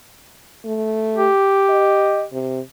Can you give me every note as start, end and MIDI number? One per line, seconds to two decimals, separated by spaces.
0.65 1.29 57
1.17 2.27 67
1.69 2.24 75
2.32 2.60 48